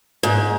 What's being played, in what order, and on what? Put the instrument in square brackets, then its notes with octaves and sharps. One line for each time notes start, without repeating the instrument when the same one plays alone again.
[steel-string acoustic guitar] G#2